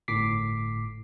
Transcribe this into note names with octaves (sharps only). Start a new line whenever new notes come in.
G1 A2 D6 B6 C7